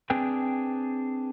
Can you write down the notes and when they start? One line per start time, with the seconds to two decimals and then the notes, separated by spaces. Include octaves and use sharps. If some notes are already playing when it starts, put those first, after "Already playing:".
0.10 C4 D4 G#4 B4 G5